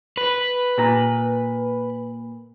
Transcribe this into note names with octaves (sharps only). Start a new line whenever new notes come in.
B4
A#2 A#5